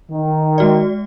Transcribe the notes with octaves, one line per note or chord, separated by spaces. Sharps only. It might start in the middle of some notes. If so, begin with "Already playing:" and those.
D#3
G#3 F#4 D5